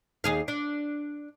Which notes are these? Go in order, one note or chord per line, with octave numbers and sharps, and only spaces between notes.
D#2 G#4 F5
D4